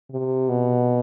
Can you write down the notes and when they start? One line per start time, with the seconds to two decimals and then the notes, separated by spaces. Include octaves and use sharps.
0.11 C3
0.49 B2